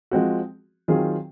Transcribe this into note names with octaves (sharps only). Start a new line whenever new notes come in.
F3 G#3 C4 F#4
D#3 F#3 C4 F4 G#4